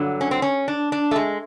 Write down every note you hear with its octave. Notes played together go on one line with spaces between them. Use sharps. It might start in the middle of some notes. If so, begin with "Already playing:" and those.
Already playing: G2 D3 F#3
C#4
C4
C#4
D4
D4
A3
G#3